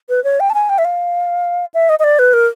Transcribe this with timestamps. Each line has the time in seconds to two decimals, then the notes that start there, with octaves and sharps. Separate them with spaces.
0.09 B4
0.24 C#5
0.40 G5
0.50 A5
0.54 G#5
0.69 G5
0.78 E5
0.85 F5
1.74 E5
1.89 D#5
1.99 D#5
2.04 D5
2.19 B4
2.33 A#4